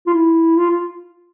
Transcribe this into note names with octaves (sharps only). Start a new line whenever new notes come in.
F4
E4
F4
F4